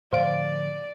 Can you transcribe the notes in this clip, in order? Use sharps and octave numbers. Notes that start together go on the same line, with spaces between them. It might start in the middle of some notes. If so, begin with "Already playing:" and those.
A2 D3 F3 C5 D5 F5 D7